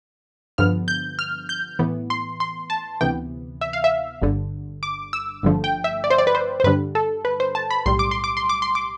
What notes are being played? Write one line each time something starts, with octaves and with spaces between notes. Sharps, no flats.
G2 D3 F3 B3 F6
G6
F6
G6
A2 E3 B3
C6
C6
A5
D2 C3 E3 B3 G5
E5
F5
E5
G1 G2 D3
D6
E6
G1 G2 D3 F3 A3
G5
E5
D5
C5
D5
B4
C5
C5
G2 D3 G3 B4
A4
B4
C5
A5
B5
B1 A2 G3 C6
D6
C6
D6
C6
D6
C6
D6